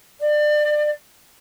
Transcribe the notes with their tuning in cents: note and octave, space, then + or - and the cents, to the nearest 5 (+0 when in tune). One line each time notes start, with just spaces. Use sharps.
D5 +30